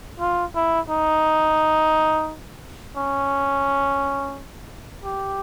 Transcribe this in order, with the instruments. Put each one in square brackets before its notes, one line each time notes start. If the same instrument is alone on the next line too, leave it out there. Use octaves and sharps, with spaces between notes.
[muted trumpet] F4
E4
D#4
C#4
G4